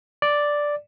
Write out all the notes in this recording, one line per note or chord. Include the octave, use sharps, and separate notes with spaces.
D5